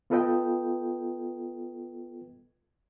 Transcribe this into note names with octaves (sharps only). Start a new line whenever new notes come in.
B3 F4 A4 B4 D#5 G5